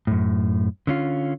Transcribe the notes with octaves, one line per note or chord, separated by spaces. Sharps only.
F#2 A2
D3 C#4 F4